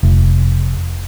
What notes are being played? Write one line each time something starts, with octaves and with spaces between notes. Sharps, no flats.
F1